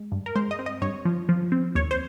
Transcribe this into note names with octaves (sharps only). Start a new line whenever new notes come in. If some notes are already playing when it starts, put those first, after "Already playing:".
Already playing: G#3
G2
A#4
G#3 C5
D#5
C4
D#5
G2 C#5
F3
F3
C4
D#2 C#5
C5